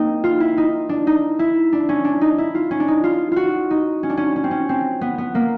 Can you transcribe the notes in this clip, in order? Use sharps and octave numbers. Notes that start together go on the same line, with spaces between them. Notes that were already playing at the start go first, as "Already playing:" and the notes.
Already playing: A#3 C4 D#4
F4
E4
D#4
D4
D#4
E4
D4
C#4
D4
D#4
E4
F4
C#4
D4
D#4
F4
F4 F#4
D#4
C#4
D4
C#4
C#4
C4
C#4
C4
B3
B3
A#3